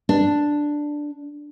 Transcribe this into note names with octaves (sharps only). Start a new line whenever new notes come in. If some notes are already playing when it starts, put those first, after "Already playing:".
D4